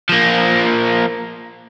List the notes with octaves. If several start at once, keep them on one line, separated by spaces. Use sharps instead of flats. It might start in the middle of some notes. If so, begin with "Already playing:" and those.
F3 A#3